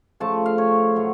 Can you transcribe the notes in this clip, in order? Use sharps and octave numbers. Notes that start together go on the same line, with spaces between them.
C#3 F3 A3 A5
F5
C#5
A2 F#3 A3